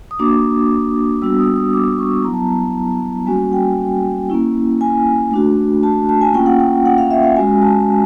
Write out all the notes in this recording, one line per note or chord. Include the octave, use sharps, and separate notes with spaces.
D#6
A#3 D4 F#4 D6
G3 B3 D4 F#4 E6
D#6
D#6
D6
C#6
F#3 B3 E4 A#5
A5
A#5
G3 A#3 C#4 F#4 G#5
G5
A#3 C#4 E4
G#5
A3 D4 F#4
A5
A5
G#5
A#3 C#4 F4 G5
F#5
G5
F#5
F5
E5
F5
G#3 C#4 F#4 G#5
A5